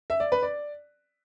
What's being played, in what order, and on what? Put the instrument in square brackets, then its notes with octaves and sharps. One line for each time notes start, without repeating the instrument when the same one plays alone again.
[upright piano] E5
D5
B4
D5